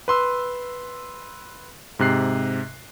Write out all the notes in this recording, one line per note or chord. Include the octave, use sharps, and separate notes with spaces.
B4 C6 E6
G#2 C3 F#6 C7